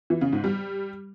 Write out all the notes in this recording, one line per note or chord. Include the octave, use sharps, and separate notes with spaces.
E3
C#3
G#2
G3